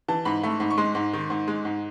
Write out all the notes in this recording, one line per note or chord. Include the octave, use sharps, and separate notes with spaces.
E3 A5
G#2 B5
A3
G#2
C#6
G#3 C6
G#2
D#3
G#2
G#3
G#2